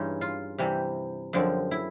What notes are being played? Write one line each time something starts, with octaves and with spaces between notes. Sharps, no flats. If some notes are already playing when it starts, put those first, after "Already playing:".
Already playing: G2 E3 G#3 C#4 D#4
F4
C3 E3 G3
F#2 D3 F3 G#3 C4
E4